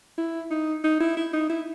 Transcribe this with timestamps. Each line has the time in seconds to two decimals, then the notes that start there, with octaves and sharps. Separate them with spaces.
0.18 E4
0.50 D#4
0.84 D#4
1.00 E4
1.17 E4
1.33 D#4
1.49 E4